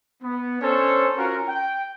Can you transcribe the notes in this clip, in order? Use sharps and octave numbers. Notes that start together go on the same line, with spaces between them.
B3
C#4 D4 A4 C5 C#5
C#4 F4 F#4 A#4
G5